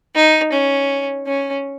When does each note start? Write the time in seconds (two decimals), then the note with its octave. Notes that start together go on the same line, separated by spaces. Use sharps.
0.15 D#4
0.52 C#4
1.27 C#4